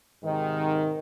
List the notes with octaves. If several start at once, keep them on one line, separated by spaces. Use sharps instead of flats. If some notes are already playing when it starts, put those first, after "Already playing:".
G#2 C3 D#3